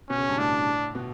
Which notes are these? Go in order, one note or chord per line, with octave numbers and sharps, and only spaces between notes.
B2 C#4
C#3
G2
A2 D4
B2